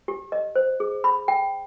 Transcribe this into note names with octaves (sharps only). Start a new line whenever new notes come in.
G4
D#5
C5
G#4
B5
G5